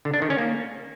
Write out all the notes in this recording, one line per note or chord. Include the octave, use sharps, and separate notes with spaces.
D3
D4
D#3
C#4
A#3